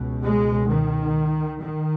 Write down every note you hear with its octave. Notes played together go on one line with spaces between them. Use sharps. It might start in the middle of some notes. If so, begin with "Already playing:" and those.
Already playing: C#2 B2
G#3
D#3
D#3